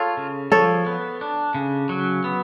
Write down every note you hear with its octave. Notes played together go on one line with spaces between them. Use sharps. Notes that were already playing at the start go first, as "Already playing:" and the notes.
Already playing: F4 A4 C#5
C#3
F3 A4 C#5
B3
D4
C#3
F#3
B3